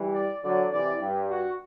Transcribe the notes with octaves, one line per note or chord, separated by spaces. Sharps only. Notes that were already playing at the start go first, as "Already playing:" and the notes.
Already playing: E3 G3
D5
D3 F#3 D5
C3 E3 D5
G2 G4
F#4